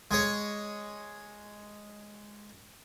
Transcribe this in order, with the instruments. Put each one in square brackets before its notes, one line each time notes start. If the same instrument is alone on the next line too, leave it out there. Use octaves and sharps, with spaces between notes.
[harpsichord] G#3 G#4 C#5